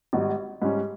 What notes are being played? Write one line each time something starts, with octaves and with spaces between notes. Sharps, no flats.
G#1 G#2 G3
G#2 G3 C#4